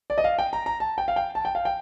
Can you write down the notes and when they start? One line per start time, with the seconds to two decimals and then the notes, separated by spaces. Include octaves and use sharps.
0.10 D5
0.18 D#5
0.24 F5
0.39 G5
0.53 A#5
0.66 A#5
0.80 A5
0.98 G5
1.08 F5
1.16 G5
1.35 A5
1.45 G5
1.55 F5
1.65 G5